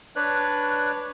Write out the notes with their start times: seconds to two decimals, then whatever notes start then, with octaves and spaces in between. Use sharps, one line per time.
0.16 D4 B4 C#5 D5 F#6